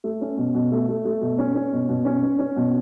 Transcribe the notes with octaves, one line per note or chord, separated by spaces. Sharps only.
A3
C#4
B2
B2
A3
A3
A3
B2
C#4
C#4
B2
B2
C#4
C#4
C#4
B2